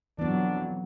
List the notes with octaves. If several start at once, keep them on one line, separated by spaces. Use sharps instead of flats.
F2 E3 F#3 B3 D4